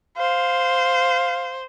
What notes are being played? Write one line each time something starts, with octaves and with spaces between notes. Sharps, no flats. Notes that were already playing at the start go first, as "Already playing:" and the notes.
C5 F5